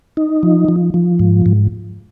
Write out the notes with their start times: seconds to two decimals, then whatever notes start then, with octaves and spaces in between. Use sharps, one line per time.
0.17 D#4
0.43 F3
0.68 F3
0.94 F3
1.19 G#2
1.46 G#2